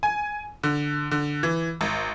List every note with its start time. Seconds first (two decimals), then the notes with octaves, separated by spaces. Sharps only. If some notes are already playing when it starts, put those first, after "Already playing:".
0.03 G#5
0.63 D3
1.11 D3
1.43 E3
1.81 G#1